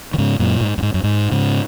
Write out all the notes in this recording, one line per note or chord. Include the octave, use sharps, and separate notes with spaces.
D#3
G#2 C#3
F#2 A#2
G#2
F#2
G#2
F#2
G#2
G#2 C#3